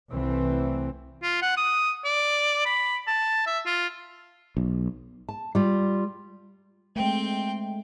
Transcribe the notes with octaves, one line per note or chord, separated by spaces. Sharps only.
C2 E3 A3 C4
F4
F#5
D#6
D5
B5
A5
E5
F4
B1
A5
G3 F4
G#3 A3 C4 G5